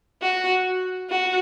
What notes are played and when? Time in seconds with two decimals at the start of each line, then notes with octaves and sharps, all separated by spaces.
0.22 F#4
1.10 F#4